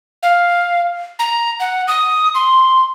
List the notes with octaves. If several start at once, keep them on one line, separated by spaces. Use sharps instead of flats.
F5
A#5
F#5
D#6
C6